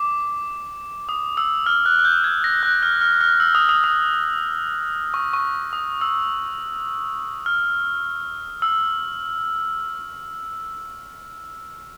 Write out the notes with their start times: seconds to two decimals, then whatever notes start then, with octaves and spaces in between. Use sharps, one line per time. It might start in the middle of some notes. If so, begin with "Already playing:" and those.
Already playing: D6
1.09 D#6
1.37 E6
1.66 F6
1.86 F#6
1.99 F#6
2.05 G6
2.24 G#6
2.44 A#6
2.63 F#6
2.83 F6
3.01 F6
3.21 F6
3.40 E6
3.55 D#6
3.69 D#6
3.84 D#6
5.14 C#6
5.33 C#6
5.73 D#6
6.01 E6
7.46 F6
8.62 E6